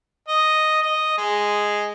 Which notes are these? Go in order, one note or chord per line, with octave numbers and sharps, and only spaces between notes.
D#5
D#5
G#3